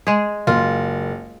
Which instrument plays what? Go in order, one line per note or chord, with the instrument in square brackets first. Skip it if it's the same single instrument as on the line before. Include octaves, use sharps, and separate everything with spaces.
[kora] G#3 G#4
[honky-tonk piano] F#1 [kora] F4